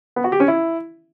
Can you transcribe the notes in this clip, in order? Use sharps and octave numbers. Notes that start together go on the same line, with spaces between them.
B3
F#4
G4
C#4
E4